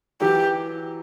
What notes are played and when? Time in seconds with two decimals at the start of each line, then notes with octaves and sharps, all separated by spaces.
0.21 E3 F#3 G4